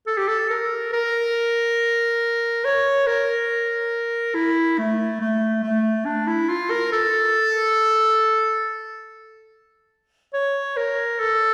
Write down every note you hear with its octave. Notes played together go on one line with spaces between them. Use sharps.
A4
G4
A4
A#4
A#4
C#5
A#4
E4
A3
A3
A3
D4
E4
F4
A#4
A4
C#5
A#4
A4